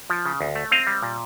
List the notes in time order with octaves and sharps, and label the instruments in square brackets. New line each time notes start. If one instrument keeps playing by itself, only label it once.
[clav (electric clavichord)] F3
C#3
D2
A3
C4 D#5 F5
G3
A#2